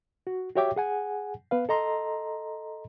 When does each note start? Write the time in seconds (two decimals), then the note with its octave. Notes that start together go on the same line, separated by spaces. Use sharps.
0.27 F#4
0.56 F#4 G4 C#5 E5 G5 D6
0.76 G#4 F#5 G#5
1.51 B3 B4 F5
1.69 A4 D#5 A#5 C6